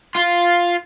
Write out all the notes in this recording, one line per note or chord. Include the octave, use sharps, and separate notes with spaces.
F4